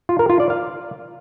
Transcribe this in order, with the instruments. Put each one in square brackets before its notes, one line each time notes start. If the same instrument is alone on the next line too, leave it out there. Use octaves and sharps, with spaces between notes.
[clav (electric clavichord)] F4
A#4
F4
D5
F5